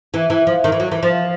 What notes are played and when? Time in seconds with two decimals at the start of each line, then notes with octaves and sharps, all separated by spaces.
0.14 E3
0.30 E3
0.47 F3
0.64 D#3
0.72 E3
0.80 F#3
0.92 E3
1.03 F3